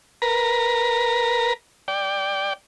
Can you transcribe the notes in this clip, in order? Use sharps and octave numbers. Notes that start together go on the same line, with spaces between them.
A#4 B4 A#5
D5 G5